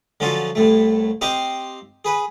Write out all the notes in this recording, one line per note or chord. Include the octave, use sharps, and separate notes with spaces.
D3 F3 F#3 C#4 F4 A5
C2 A2 A3
C4 G4 C5 D#5 F5 A#5
G#4 B4